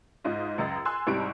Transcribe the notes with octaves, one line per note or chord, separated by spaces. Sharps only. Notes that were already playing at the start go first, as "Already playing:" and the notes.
G#2 F4 D#5
C#2 F#2 D#5 E6 A6
G#5 C6 E6 F#6
C2 G#2 G3 C4 C#6 D7